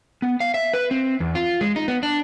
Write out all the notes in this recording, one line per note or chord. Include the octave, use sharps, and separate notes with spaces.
B3
F5
E5
B4
C4
E2
F4
G#3
D#4
B3
D4